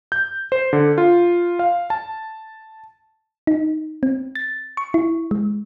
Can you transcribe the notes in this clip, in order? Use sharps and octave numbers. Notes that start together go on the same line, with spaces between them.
G6
C5
D3
F4
F5
A5
D#4
C4
A6
C#6
E4
G#3